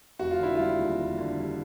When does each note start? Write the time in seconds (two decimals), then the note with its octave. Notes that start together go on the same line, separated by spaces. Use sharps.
0.19 F1 F#4
0.31 F4
0.39 D3 E4
0.55 G3 F4
0.79 D#2
0.99 F1
1.18 D3
1.38 G3